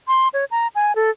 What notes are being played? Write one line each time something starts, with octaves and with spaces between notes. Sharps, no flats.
C6
C#5
A#5
G#5
A4